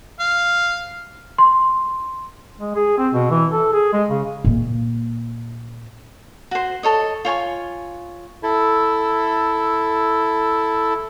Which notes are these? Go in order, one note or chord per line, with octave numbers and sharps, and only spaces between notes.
F5
C6
G#3
G#4
C4
B2
E3
A4
G#4
G#3
C#3
A#2 A#3
F#4 C5
A4 C#5 D#5
F4 C#5 G#5 C#6
E4 A4